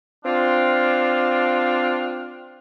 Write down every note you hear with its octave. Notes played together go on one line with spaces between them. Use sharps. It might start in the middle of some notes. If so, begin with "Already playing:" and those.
C4 D4 F4